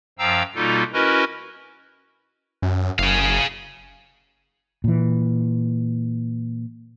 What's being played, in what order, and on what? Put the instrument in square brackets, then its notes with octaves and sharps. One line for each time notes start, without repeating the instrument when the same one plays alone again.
[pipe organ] F#2 F3 F5 G5 A#5 E6
B2 G3 A#3 D#4 F4 A4
C#4 E4 F#4 A#4 B4 D#5
[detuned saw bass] F#2
[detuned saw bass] F#1 [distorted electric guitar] G#4 F5
[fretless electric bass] A#2 E3